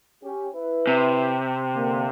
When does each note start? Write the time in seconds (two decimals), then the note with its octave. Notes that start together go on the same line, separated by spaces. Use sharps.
0.23 C#4 G4
0.55 E4 B4
0.87 C3
1.75 D3 A#3